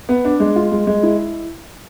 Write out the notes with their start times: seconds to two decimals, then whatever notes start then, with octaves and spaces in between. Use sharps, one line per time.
0.09 B3
0.25 D4
0.40 G#3
0.56 F4
0.72 G#3
0.87 G#3
1.03 E4